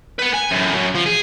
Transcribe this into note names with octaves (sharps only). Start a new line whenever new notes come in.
B4 F#5
G#5
F#2 A2
F#2
F3
G#4